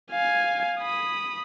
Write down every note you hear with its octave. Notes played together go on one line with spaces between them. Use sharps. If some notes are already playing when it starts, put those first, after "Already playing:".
F5 G#5
B5 D#6